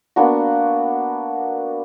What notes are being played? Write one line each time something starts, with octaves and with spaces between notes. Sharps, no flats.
A#3 B3 D4 F#4